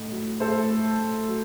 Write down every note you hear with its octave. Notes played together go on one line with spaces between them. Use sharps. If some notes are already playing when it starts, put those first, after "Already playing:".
Already playing: A2 D#4
F#3
A2 A4 C5
A3
A2
F#3